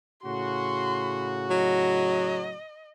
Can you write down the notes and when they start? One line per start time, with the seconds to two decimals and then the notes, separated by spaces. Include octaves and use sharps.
0.23 A2 C#3 F#4 C6
1.51 F#3 D#5